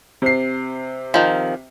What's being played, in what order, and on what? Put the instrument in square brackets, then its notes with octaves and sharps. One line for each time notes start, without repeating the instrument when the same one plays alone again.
[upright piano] C3 C7
[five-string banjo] D#3 F3